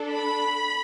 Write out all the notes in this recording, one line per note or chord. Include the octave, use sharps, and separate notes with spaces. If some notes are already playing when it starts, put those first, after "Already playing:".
Already playing: D4 A4
B5